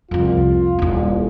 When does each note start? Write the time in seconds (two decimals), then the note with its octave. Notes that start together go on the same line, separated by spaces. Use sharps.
0.11 C2 F2 F4
0.79 D#1 E4